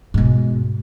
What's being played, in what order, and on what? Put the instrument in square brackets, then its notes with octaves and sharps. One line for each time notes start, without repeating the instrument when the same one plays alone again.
[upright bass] G#2 B2